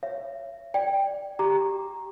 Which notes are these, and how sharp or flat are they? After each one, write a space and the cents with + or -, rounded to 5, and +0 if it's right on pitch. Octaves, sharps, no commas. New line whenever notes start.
C#5 +0 E5 +40
D5 +5 G5 +5
G4 +0 A#5 +0 D6 +0